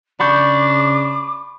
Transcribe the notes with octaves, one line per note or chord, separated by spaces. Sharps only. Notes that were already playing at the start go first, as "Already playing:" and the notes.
C#3 D4 B5 C#6 D6 G6